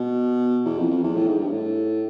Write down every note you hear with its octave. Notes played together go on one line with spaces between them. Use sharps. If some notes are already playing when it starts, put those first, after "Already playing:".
Already playing: B2
E2
F2
F2
E2
A2
G#2
G2
A2